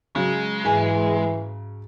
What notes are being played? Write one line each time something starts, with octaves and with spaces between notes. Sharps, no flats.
C#3 F#3 G#3
G#2 E3 G#5